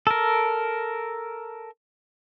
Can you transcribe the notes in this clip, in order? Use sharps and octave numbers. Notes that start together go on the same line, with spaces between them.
A4 A#4